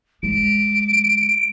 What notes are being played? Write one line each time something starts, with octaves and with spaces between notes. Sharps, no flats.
G#3 D7